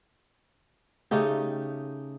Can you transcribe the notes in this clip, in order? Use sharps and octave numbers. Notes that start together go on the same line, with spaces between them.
C#3 A3 D#4 G4